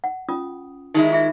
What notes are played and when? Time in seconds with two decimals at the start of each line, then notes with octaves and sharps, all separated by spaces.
0.04 F#5
0.29 C#4 F4 D#6
0.94 D#3 G#3 D#4 E4
1.11 F4 G#4 E5